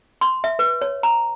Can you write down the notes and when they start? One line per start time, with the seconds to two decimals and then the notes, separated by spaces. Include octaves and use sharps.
0.21 C6
0.44 E5
0.59 B4
0.81 C#5
1.03 A#5